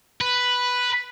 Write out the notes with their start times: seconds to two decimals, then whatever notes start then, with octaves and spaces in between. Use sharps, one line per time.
0.21 B4